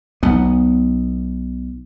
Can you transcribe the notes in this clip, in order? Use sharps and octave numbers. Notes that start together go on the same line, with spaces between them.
B1 B3